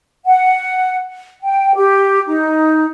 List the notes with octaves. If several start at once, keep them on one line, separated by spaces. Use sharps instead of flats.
F#5
G5
G4
D#4